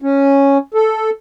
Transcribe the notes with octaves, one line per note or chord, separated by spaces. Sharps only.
C#4
A4